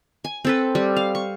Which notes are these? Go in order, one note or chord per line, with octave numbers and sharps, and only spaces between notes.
G#5
C4 A4 B4
G3
F5
C#6